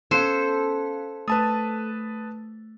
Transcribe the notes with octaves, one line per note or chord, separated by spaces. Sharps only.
B3 C#4 A4 C5 F5
A3 B4 A5 D#6